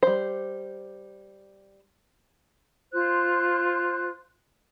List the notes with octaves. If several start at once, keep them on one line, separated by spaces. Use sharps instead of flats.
G3 C5
F4 C5 F#6